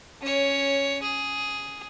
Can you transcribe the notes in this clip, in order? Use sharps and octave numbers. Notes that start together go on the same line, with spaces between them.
C#4 C#5
G#4